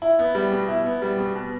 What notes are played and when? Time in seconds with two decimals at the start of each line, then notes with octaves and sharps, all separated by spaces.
0.02 E4
0.19 B3
0.35 G3
0.52 B2
0.68 E4
0.86 B3
1.02 G3
1.19 B2
1.36 B2